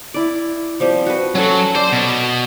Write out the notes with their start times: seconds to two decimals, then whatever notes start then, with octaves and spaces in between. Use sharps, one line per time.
0.14 E4 D5
0.80 F3 G3 C4
1.06 F#4 B4
1.35 F#3 C#4 A4
1.75 C5 D5 C6
1.92 B2